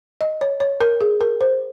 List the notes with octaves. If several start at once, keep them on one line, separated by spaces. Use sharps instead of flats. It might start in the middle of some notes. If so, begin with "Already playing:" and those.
D#5
C#5
C#5
A#4
G#4
A#4
C5